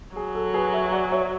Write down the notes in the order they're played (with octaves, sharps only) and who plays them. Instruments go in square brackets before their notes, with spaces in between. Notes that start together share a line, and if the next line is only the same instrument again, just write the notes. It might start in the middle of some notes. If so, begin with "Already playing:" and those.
[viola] F#3 [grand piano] G#4
[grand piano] A4
G#4 B4
E5 G#5
D5 F#5
C#5 E5